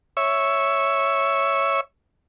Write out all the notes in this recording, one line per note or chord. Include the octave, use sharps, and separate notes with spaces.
C#5 E5